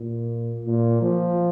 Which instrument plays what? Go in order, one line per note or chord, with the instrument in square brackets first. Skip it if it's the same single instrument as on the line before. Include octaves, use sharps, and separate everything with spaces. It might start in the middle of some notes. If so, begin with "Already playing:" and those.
Already playing: [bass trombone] A#2
A#2
F3